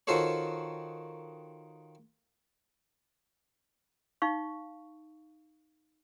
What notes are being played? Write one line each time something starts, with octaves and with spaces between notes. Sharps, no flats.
D#3 F4 F#4 A4 C5 C#5
D#4 F5 C#6